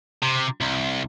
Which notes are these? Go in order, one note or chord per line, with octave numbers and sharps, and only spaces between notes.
C3
C2